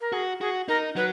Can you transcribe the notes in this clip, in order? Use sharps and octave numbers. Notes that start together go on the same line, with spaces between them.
A#4
F#4 G#4
F#4 G#4
D#4 A#4
F#3 B4